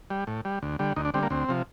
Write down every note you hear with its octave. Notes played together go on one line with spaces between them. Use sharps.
G3
A2
G3
D2
D3 G3
D2 D#4
D4
D3 G3 C4
A#3
D2 C4
C3 F3